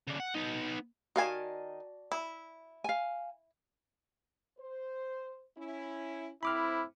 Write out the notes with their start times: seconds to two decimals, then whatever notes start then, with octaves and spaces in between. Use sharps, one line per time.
0.07 C#3 D4
0.20 F#5
0.35 B3 D#4
1.16 D#3 F#4 D5 F5 G#5 A5
2.12 E4
2.84 F5 G#5
4.58 C5
5.57 C#4 E4
6.43 A2 C4 E4 B5 D6 F6